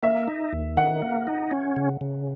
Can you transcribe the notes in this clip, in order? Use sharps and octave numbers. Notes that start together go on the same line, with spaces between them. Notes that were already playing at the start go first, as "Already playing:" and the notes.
A#3 E5
D#4
D#2
D#3 F#5
A#3
D#4
C#4
C#3
C#3